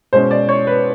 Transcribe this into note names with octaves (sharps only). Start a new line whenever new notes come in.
B2 G#3 C#4 C5
D5
C#5
B4